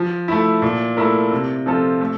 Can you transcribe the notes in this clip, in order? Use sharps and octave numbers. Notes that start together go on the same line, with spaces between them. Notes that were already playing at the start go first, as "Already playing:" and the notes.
Already playing: F3
A3 E4
A#2
A3 E4 A#4
C3
F3 C4 F4 A4
A3